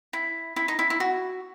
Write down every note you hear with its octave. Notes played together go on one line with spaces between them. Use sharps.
E4
E4
D#4
E4
E4
F#4